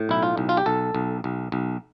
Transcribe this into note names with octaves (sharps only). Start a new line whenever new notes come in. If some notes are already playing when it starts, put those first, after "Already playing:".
Already playing: A2
B1 E4
F4
B1
F4
G4
B1 A4
B1
B1
B1